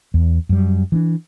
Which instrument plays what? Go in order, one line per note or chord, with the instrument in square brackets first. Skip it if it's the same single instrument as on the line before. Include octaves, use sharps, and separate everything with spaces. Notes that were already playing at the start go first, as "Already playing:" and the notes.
[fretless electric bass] E2
F#2 G3
E3 C4 D4